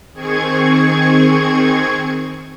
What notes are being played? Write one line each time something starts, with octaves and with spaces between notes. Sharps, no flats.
D#3 C4 G#4 C#6 G#6